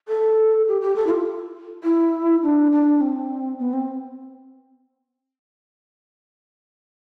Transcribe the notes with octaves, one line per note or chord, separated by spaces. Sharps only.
A4
G4
G4
A4
E4
F4
E4
D4
D4
C4
B3
C4